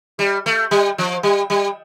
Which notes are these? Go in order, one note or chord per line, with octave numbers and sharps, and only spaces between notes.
G3
A3
G3
F3
G3
G3